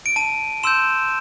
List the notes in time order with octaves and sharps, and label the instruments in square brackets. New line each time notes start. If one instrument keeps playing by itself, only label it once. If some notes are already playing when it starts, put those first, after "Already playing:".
[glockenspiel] D7
A5 D#7
C6 E6 G6 E7